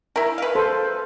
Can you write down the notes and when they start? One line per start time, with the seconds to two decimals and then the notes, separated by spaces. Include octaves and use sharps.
0.16 E4 A#4
0.38 B4 F5
0.55 A4 C5